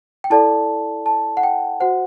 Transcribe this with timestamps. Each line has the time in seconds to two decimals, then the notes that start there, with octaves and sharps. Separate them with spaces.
0.24 G5
0.30 E4 A4 D5 A5
1.06 A5
1.37 F#5
1.43 G5
1.80 F#4 C5 F#5